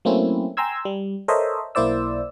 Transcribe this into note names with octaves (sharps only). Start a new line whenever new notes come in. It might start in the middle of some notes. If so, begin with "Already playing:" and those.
F#3 A3 A#3 C4 C#4 E4
G5 G#5 A#5 C6 E6 G#6
G3
A4 A#4 C5 C#5 D#5 E5
B1 A#3 E4 C5 D5 E6